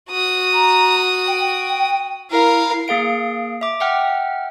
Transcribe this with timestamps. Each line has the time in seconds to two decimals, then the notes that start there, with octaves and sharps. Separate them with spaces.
0.10 F#4 D#6
0.53 A#5
1.27 G5
2.30 E4 A#4 F5
2.88 A#3 G#4 F5 D7
3.61 E5 D6
3.80 E5 F#5 G5 F6